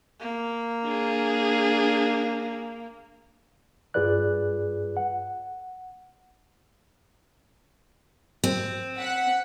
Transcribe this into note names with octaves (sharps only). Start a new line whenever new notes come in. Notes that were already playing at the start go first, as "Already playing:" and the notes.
A#3
D4 G#4
G2 F4 G#4 B4 D5 F#6
F#5
C4
F#5 B6